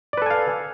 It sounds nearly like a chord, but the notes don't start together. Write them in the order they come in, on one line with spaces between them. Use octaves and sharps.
D5 B4 A4 G#5 F5